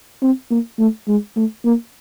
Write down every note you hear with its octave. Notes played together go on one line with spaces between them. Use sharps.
C4
A#3
A3
G#3
A3
A#3